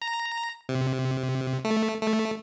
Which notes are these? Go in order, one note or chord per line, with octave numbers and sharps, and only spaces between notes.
A#5
C3
A3
A3